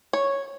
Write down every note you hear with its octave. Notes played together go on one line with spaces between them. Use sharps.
C#5